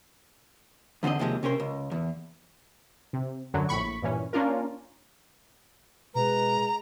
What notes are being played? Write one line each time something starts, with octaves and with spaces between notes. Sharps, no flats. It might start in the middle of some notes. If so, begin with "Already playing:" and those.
E2 D3 F3 C4 D#5
D#2 C3 F3 G#3
C3 C#4 A#4 C5
C#2
E2
C3
F#2 D3 F#3
A#1 A2 B5 C#6
G2 A#2 E3 C#4
A#3 C#4 D4 F4 A#4
B2 G#3 B4 A#5